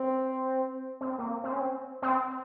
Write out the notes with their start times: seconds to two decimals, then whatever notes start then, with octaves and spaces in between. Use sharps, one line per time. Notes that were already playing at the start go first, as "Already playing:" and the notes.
Already playing: C4
1.01 C4
1.18 A#3
1.44 C4
1.52 C#4
1.60 C4
2.02 C4